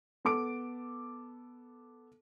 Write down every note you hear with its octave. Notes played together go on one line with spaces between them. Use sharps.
B3 A4 D6 D7